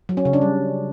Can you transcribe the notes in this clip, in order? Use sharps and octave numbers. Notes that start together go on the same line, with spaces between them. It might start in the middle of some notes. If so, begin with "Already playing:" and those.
F#3
C#4
C#3
D4
G3